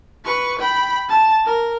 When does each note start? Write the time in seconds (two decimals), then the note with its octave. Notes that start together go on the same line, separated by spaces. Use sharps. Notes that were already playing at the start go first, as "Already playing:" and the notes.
0.25 B4 C#6
0.59 G5 B5
1.09 A5
1.45 A#4